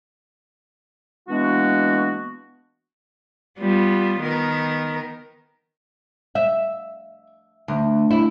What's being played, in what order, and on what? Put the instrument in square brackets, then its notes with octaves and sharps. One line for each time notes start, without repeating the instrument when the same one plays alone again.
[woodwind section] E3 G#3 A#3 B3 D4 F#4
[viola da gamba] G3 B3 F4
D#3 B3 A#4
[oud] E5
D2
E4